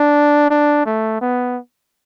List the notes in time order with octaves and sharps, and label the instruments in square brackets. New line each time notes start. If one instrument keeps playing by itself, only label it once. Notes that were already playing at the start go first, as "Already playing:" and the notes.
Already playing: [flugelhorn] D4
D4
A3
B3